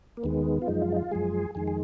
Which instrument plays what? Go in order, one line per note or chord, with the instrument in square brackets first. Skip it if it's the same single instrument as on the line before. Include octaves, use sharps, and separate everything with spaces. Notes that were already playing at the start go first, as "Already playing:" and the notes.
[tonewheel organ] A#3
D#2 D#3 G#3 B3
F4
F#2 F3 G#3 D#4
F4
D#4
F4
F#2 F3 G#3 G#4
F2 D#3 G#3 G#4
G#4